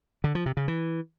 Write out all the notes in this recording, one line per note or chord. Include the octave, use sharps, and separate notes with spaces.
D3
F3
C3
C#3
E3